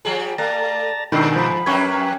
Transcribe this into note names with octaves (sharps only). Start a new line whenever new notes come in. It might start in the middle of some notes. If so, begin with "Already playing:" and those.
F3 G3 G#4
A3 D5 A5 A#5
G2 B2 D#3 D4 G4 B5 C7
F3 B5
F2 A#3 C#4 G4 B4 C#6 G#6